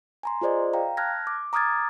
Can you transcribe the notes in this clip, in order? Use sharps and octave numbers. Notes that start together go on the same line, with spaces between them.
G#5 A#5 C6
F4 G#4 C5 D5 D#5
F5 G5 A#5
A5 F6 F#6 G#6 A#6
D6
A#5 D6 D#6 F6 G#6 A6